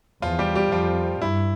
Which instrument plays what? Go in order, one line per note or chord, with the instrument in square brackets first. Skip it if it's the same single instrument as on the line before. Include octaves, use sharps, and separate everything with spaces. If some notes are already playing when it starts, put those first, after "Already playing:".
[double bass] E2 [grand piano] F3 F4
[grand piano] G3 G4
G3 G4
[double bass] F2 [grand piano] F3 F4
[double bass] G2 [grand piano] E4